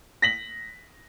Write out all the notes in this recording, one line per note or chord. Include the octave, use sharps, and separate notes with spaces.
A#6 B6 F#7